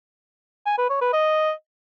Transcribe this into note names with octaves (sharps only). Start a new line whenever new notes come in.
G#5
B4
C#5
B4
D#5